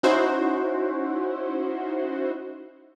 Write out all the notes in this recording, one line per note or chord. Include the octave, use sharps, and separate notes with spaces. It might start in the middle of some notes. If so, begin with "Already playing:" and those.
C#4 D#4 E4 F#4 C5